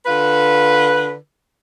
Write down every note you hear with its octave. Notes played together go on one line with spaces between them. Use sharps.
D3 F4 B4